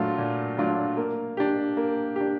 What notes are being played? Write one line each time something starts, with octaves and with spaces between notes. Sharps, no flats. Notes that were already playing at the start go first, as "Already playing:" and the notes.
Already playing: A#2 F#3 A3 D4 F4
A#2
F#3 A3 D4 F4
A#3
D4 G4
A#3
D4 G4